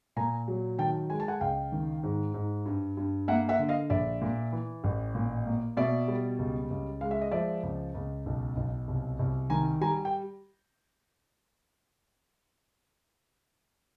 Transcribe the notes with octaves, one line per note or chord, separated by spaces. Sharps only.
A#2 G#5 A#5
F#3
D#3 G5 A5
G#3 G#5
A5
F#5 G#5
C#2 F5 G5
D#3
G#2
G#2
G2
G2
A#3 E5 F#5
E5 F#5
D3
D#5 F5
A#1 D5 E5
A#2
E3
A1
A#2
A#3
B2 D5 E5
G3
C#2
C#2
G#3 F5
E5
D#5
F3 D5 E5
C#2
C#2
B1
B1
C2
C2
D#3 G#5 A#5
G3 G#5 A#5
G5